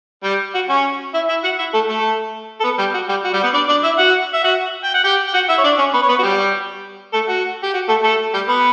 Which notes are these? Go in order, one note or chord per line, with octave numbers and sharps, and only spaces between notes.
G3 G4
F#4
C#4 C#5
E4 E5
E4 E5
F#4 F#5
E4 E5
A3 A4
A3 A4
A4
B3 B4
G3 G4
F#4
G3 G4
F#4
G3 G4
B3 B4
D4 D5
D4 D5
E4 E5
F#4 F#5
E5
F#4 F#5
G5
F#5
G4 G5
G5
F#4 F#5
E4 E5
C#5
D4 D5
C#4 C#5
B3 B4
C#5
B3 B4
F#4
G3 G4
A3 A4
F#4
G4
F#4
A3 A4
A3 A4
G3 G4
B3 B4